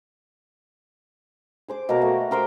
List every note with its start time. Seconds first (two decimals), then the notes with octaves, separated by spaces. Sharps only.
1.68 G#4 C5 D6
1.89 B2 A#3 F#4 A#4
2.02 A3
2.31 G4 A#4 C5 G5